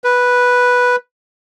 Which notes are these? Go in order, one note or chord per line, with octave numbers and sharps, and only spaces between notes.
B4